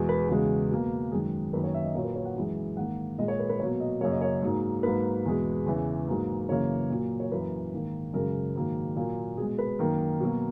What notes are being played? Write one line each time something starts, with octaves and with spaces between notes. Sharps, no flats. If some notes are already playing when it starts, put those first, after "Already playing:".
Already playing: E2 B2 G#3
B4
E2 C#3 G#3 F#4
B2 A#3
F#2 D#3 G#3 G#4
F#2 D#3 A#3 B4
C#5
E5
D#5
A#2 F#3 A#3 C#5
B4
C#5
F#5
F#2 E3 G#3
G#2 D#3 A#3 F#5
A#2 G#3 D#5
C#5
B4
B4
B2 F#3 A#3 C#5
D#5
F#2 C#3 F#3 A#3 C#5
D#5
C#5
G#2 F#3 A#3
G#2 F#3 A#3 B4
E2 B2 G#3
E2 C#3 E3
G#2 F#3 A#3
F#2 C#3 E3 A#3 C#5
A#2 F#3 A#3
C#5
F#2 E3 A#3 B4
G#2 D#3 A#3
F#2 C#3 G#3 A#4
G#2 D#3 F#3 A#3
A#2 F#3 A#3
B2 G#3 G#4
B4
F#2 D#3 A#3 A#4
B2 F#3 A#3